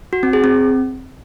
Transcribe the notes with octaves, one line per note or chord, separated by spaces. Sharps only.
F#4
C4
G#4
C4